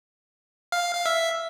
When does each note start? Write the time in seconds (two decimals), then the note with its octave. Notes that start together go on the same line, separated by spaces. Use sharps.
0.72 F5
0.95 F5
1.06 E5